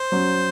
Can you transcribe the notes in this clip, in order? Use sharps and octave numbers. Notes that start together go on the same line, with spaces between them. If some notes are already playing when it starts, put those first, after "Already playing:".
Already playing: C5
F#2 F#3